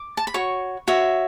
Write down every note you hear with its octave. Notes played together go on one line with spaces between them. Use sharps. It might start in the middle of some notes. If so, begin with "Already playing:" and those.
Already playing: D6
A5
B5
F#4 C#5 C#6
F#4 C#5 E5